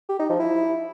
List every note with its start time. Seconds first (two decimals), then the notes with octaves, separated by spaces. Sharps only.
0.09 G4
0.19 D#4
0.30 F3
0.40 E4